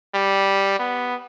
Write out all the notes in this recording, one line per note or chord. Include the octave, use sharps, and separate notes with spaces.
G3
B3